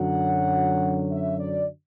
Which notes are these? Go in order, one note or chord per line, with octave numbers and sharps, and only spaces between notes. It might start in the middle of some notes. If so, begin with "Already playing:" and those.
Already playing: F#2 D3 F#3 F#5
E5
D5